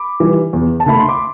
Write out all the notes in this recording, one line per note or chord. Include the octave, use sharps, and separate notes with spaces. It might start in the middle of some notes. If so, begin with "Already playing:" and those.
Already playing: B5 D6
E3 G3
E2
A5
D3 A3 B5
C6
D6